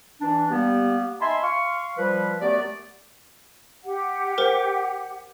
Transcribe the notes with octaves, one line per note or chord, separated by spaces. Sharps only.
E3 D4
G3 A#3 B3 G4
D#4 E5 G#5 A5 B5 C6
F5 C6 C#6
F3 G3 B4
F#2 A3 B3 G4 D5
G4 F#5
A#4 C5